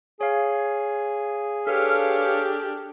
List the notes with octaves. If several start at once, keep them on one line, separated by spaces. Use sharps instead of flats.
G#4 C#5 F5
D4 G4 A4 B4 C#5 F5